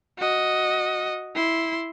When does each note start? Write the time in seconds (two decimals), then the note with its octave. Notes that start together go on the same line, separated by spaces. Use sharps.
0.18 F#4 D#5
1.35 E4 C6